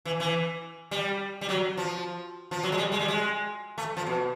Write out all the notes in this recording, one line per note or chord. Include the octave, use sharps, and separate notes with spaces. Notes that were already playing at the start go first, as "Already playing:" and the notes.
E3
E3
G3
G3
F#3
F3
F3
F#3
G#3
G3
G#3
G3
G#3
A3
F3
B2